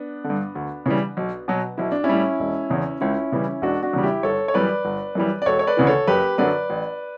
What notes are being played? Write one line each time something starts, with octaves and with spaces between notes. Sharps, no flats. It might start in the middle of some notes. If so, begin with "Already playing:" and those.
Already playing: B3 D4
D3
G2
D2
C#3 E3 G3
B1
B2 F#3
B1 E4
D4
C#4 E4
A2 G3
E1
E2 C#3
C#2 C#4 E4
C#3 E3 G3
E1 D4 F#4
D4 F#4
E2 C#3 G3
E4 G4
G1 A4 C#5
C#5
F#2 E3 G3 B4 D5
G1
F#2 E3 G3
D5
E1 A4 C#5
C#5
B4 D5
D2 C#3 E3
A4 C#5
F#1 G4 B4
F#2 D3 F#3 B4 D5
A1